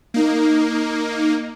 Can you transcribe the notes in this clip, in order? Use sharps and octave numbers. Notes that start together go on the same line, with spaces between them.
A#3 D#4